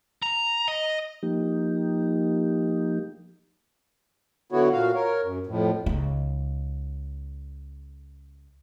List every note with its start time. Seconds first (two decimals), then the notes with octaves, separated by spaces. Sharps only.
0.22 A#5
0.68 D#5
1.23 F3 A#3 D#4 G4
4.52 D3 F#3 B3 E4 F#4 C#5
4.73 A#2 F#4 F5
4.95 A#4 C#5
5.23 F#2
5.47 F2 A2
5.86 C#2 D#4